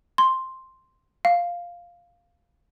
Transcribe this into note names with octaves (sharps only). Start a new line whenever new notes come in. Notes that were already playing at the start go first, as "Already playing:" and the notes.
C6
F5